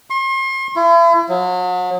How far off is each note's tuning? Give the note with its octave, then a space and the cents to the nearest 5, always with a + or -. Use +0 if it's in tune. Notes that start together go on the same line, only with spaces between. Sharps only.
C6 +40
E4 +40
F#3 -35